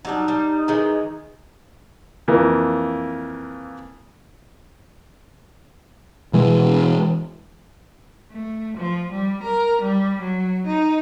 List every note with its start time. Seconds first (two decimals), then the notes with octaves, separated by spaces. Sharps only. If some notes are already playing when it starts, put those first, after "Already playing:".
0.05 F#3 G3 D4 D#4
0.28 G3
0.68 D#3 E3 G#3
2.28 F2 E3 A#3
6.33 B2 E3 G#3
8.32 A3
8.78 F3
9.12 G3
9.43 A#4
9.82 G3
10.22 F#3
10.67 D#4